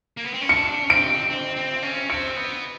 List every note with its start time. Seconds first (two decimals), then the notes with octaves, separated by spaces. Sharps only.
0.17 A#3
0.25 B3
0.33 C4
0.42 C#4
0.49 D4 C#7
0.84 C#4
0.89 C4 D7
1.30 C4
1.56 C4
1.83 C#4
2.09 C4 C#7
2.36 B3